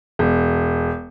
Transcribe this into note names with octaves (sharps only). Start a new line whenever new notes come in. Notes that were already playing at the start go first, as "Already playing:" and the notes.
E1